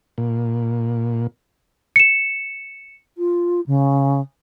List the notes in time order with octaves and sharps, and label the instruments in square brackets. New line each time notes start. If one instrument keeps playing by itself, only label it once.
[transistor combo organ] A#2
[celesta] C#7 E7
[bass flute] F4
C#3